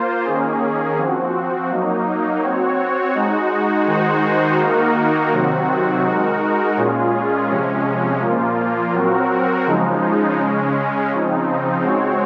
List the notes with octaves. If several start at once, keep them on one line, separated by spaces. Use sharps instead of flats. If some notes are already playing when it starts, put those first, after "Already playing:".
Already playing: A#3 F4 C5
D#3 A#3 C#4 G#4
F3 C4 F#4
F#3 A#3 D#4
C4 F#4 C#5
G#3 D#4 F#4
D#3 G#3 D#4 F#4 C5
D#3 A#3 D#4 F#4 A#4
C3 D#3 F#3 C4 F#4
G#3 D#4 F#4 A#4
A#2 G#3 C#4 F4 G#4
C3 F3 G#3 C#4
A#2 F3 A#3 F4
F#3 C4 F#4 A#4
C#3 F3 G#3 D#4
C#3 G#3 C#4
C#3 F3 C4 D#4
G#3 C4 F#4 C#5